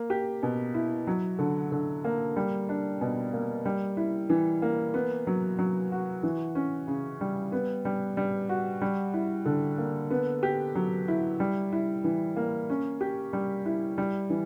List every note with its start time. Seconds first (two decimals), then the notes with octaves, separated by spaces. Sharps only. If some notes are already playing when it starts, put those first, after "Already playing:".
Already playing: A#3
0.10 G4
0.43 B2
0.74 E4
1.07 F#3
1.39 D3
1.72 D3
2.04 A#3
2.36 G3
2.69 D4
3.01 B2
3.33 A#3
3.65 G3
3.97 E4
4.30 E3
4.62 A#3
4.94 B3
5.27 F#3
5.58 F#3
5.92 F#4
6.23 E3
6.55 C#4
6.87 C#3
7.21 G3
7.52 B3
7.85 G3
8.17 G3
8.49 F#4
8.81 G3
9.14 E4
9.46 D3
9.78 A#3
10.10 B3
10.43 G4
10.75 F#3
11.08 E4
11.40 G3
11.72 E4
12.04 E3
12.36 A#3
12.69 C#4
13.00 G4
13.33 G3
13.66 E4
13.98 G3
14.30 E3